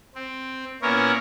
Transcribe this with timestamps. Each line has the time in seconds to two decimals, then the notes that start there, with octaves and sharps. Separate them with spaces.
0.15 C4
0.82 A#2 B3 C#4 E4 A#4 C#5